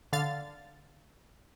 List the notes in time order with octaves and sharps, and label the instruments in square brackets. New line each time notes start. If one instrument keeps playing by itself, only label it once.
[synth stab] D3 F5 A6